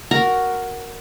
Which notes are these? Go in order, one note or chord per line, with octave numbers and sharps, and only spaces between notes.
F#4 A#4 A#5